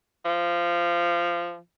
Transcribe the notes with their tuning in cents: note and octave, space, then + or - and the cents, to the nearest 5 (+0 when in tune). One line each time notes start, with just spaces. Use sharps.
F3 -15